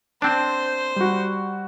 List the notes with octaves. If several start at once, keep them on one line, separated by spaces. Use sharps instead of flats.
C4 D4 C5
G3 F#4